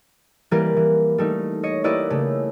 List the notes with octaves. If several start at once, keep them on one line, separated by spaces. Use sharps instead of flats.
E3 G3 A#3 G4 A#4 B4
E3
G3 A3 D#4
C#5 D#5 C#7
A#3 E4 G4 B4 D5 D#5
C#3 A3